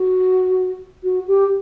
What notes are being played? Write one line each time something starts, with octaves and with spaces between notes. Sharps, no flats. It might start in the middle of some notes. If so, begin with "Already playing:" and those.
Already playing: F#4
F#4
G4